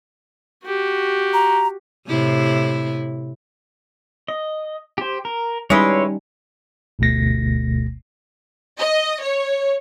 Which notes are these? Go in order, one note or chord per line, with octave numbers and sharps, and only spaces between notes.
F#4 G4
A#5
A2 C3 E4
D#5
G4 C5
A#4
G3 G#3 C#4 D#4 E4 B4 C#5 C6
G1 D2 B2 A3 A#6
D#5
C#5